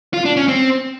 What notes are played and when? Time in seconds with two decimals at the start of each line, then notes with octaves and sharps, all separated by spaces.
0.14 F4
0.25 D4
0.37 C#4
0.48 C4